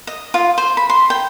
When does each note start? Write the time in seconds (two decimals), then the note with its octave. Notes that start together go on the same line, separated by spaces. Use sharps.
0.07 D#5
0.34 F4
0.58 C5
0.77 B5
0.90 C6
1.10 G5